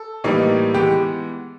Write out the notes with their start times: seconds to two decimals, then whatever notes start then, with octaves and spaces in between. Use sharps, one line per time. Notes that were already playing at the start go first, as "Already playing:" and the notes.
Already playing: A4
0.24 A2 E3 G3 A#3 D#4
0.74 E3 G#3 B3 G4 G5